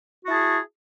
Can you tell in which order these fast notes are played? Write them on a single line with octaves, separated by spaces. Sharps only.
F#4 E4 A5 G#4